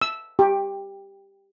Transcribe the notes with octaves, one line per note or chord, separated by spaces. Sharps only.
E6
G4